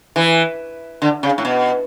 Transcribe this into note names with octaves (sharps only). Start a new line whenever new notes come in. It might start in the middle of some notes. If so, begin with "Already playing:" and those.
E3
D3
C#3
A2
B2